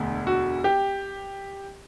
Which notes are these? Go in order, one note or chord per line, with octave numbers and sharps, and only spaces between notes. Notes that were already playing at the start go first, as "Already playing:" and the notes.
Already playing: E1 D2 D3
F#4
G4